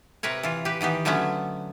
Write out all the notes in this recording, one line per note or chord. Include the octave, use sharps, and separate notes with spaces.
C3 A#4 B4 C#5
E3 F4
G4 B4
D#3 E3 B3 G4
D3 F#3 A3 B3 C#4